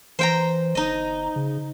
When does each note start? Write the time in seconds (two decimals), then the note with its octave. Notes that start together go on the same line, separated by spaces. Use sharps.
0.19 E3 C5 G5 A#5
0.75 G1 D#4 D#5
1.36 C#3